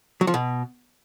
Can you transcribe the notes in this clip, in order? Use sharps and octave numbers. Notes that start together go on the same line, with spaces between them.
F#3
F3
B2